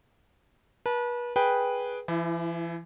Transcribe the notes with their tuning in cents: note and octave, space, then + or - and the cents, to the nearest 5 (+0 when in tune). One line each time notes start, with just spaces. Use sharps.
B4 -35 A5 -15
G#4 +0 B4 -10 G5 +0
E3 +40 E4 +5